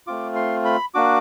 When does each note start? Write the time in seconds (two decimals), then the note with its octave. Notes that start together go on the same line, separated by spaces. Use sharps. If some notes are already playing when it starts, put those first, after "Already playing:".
0.07 A3 C4 F4 D6
0.35 C6
0.65 B5
0.94 A#3 D4 F#4 D6